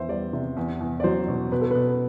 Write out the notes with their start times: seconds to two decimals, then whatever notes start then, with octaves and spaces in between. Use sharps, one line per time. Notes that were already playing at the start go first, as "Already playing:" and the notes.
Already playing: E2 B3 C5 E5
0.09 G3 D5
0.33 C3
0.57 E2
0.81 E2
1.00 D5
1.04 F#3 C5
1.28 B2
1.52 B2 B4
1.61 A4
1.71 B4
1.75 B2